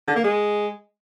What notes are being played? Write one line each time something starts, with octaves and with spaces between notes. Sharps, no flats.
D3
A#3
G#3